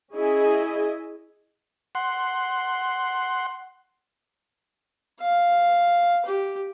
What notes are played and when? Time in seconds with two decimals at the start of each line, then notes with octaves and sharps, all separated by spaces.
0.13 C#4 E4 G#4 D#5 E5 G#5
1.95 F#5 C6
5.20 F5
6.26 G4